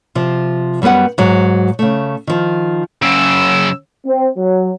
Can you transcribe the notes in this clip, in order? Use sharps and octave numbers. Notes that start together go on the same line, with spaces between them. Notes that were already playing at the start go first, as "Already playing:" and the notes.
C3 F3
F#2 G3 B3 B4 F#5
G#2 F#3
C#3 A3
D#3 F3
F#2 C#3 E6
C4
F#3